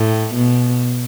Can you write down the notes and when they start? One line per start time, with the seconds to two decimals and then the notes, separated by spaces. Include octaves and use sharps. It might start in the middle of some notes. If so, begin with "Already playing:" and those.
Already playing: A2
0.35 B2